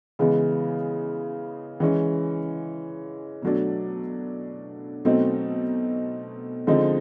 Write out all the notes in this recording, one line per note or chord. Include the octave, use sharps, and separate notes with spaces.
C#3 E3 G#3 B3
E3 G#3 C#4
B2 F#3 A3 D4
B2 F#3 A3 C4 D#4
D3 F3 G#3 C4 D#4